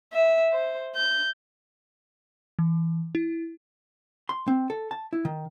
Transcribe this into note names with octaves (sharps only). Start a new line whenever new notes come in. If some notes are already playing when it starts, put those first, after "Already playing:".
E5
C5
G6
E3
E4
C6
C4
A4
A5
E4
D#3